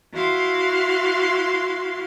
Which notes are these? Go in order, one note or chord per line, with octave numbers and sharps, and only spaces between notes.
E4 F#4 F5 C6